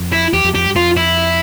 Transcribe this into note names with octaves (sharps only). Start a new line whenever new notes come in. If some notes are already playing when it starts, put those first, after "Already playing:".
Already playing: F2
E4
E2 G4
F2
F2 G4
G2
F2 F4
E4